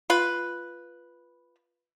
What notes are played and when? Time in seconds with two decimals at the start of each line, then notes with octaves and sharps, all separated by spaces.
0.10 F4 B4